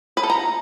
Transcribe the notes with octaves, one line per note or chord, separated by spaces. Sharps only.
B4
A4
A#5